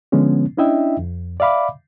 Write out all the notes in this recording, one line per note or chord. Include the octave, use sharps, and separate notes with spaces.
D3 F3 G#3 B3 C#4
C#4 D4 E4 D#5 E5 G5
F2
D5 E5 F5 B5 D6